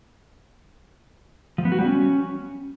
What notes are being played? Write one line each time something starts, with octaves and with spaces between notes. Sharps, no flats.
F3
B3
F#4
G3
C#4